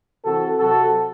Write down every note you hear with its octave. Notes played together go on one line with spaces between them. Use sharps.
C3 E3 C4 F#4 A4
C3 F#3 C4 F#4 A4